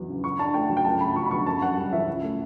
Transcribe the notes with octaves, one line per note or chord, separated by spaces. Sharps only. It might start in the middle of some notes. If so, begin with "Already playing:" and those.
Already playing: E2 F#3
C#3
C#3 C#6
D4 A5
A3 G5
F#3
G5
C#2 A5
A3 B5
F#3 C#6
B5
B2 C#6
F#2 A5
C#4 F#5
G3
E3 E5
C#2
A3